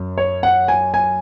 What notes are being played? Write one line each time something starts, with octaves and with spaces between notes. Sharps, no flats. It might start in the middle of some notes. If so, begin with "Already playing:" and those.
Already playing: F#2
C#5
F#5
G#5
G#5